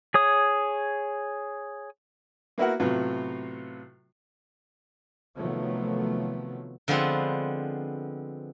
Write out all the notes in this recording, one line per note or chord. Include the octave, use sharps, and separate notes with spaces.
G#4 C#5 D#6
A#3 B3 E4 F#4 A#4 F#5
A2 C3 F#3 B3 F4
C3 D#3 F3 F#3 A3 B3
D3 F3 G#3 B3 C4